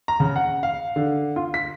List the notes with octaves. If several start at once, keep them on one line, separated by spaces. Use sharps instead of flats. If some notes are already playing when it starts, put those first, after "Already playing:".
A#5
C#3
F#5
F5
D3
F4
B6